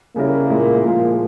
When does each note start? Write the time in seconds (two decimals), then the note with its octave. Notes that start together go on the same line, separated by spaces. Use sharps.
0.16 C#3 G3 A#3 C#4 E4 A#4
0.50 A#2 G#3 E4
0.83 A#2 F3 G#3